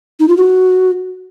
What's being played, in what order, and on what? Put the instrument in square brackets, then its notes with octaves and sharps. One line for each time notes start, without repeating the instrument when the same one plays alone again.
[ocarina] D#4
F4
F#4